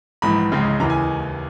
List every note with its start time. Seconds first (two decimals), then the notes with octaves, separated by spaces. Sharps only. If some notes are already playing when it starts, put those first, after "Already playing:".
0.22 A#1 G#2 E3 B5
0.52 C#2 C#3 G#3
0.80 D#2 C#3 E3 A#5
0.90 G#5